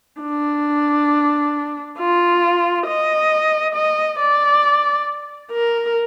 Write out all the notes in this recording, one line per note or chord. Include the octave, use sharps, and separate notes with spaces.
D4
F4
D#5
D#5
D5
A#4